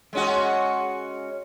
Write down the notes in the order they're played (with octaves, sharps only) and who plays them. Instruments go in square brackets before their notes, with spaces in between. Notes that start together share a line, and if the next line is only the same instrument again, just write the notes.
[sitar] G#3 C#4 F#4